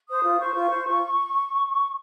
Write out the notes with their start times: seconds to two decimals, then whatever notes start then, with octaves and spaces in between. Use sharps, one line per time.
0.09 C5 D#6
0.24 F4
0.39 C5 C#6
0.55 F4
0.70 C5
0.86 F4